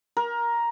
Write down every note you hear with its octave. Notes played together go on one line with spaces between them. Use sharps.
A#4